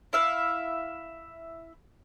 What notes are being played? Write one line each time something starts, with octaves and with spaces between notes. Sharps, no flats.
E4 E5 F5